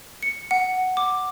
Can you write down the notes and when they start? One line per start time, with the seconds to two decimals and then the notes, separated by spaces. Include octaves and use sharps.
0.23 C#7
0.51 F#5
0.97 D6